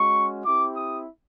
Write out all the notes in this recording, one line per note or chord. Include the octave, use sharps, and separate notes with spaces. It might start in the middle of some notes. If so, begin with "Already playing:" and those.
Already playing: G#3 C#4 F#4 C#6
C4 E4 G4 D6
D#6